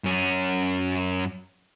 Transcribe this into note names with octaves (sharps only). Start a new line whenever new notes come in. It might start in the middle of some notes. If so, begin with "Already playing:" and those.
F#2 C#4